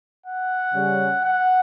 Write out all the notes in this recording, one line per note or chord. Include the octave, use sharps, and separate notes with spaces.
F#5
C#3 G3 C#4
F#5